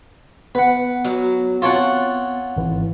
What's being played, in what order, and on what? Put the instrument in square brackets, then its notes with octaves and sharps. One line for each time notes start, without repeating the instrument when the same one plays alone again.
[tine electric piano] B3 [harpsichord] B4 F#5
[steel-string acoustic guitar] F#3
[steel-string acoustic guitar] C4 F#5 [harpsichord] F4 C#5 A5
[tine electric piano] G#1 E3